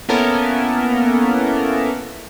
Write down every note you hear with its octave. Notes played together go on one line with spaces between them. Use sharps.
A#3 B3 C#4 E4 A4 A#4